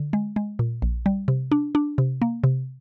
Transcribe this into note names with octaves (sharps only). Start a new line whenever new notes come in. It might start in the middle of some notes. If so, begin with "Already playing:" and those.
Already playing: D3
G#3
G#3
A#2
A#1
G3
C3
D4
D4
C3
A#3
C3